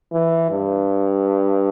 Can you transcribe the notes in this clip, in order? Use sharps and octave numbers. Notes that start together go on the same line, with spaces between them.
E3
G2